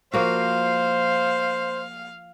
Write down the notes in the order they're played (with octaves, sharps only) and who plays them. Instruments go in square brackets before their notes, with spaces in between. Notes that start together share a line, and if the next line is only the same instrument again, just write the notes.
[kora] F3 A#3 F#4 [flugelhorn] C5 [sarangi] F5